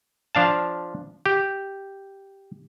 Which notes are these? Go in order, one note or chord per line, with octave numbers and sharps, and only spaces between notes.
F3 D4 F5 A5
G4